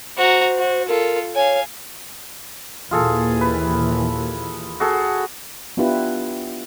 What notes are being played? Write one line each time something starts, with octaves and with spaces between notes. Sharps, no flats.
F#4 C5 A#5
F#4
F4 A4 A#4
C#5 F5 G#5
D#2 A#2 E3 F4 G#4 A4
B4
F#4 G#4 A4
B3 D4 E4 F4 G4 B4